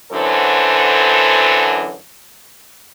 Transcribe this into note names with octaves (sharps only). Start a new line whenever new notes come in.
F#2 D3 E3 F#3 A4 C5